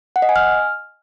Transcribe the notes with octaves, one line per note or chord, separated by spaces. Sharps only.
F#5
D#5
G#5
F6